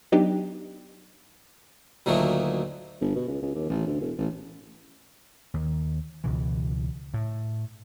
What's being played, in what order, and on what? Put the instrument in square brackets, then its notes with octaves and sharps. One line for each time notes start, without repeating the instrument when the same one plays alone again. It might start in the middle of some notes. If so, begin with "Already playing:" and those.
[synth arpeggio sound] F#3 B3 D4 D#4 G4
[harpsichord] D2 A#2 D#3 F#3 A3 A#3
[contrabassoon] G1
B2
C#2
C#2
D#2
A1
D2
E1
A1
[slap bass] D#2
C#2 B2 E3
A2